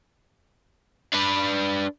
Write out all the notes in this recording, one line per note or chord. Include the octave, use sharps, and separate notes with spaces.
D4 B4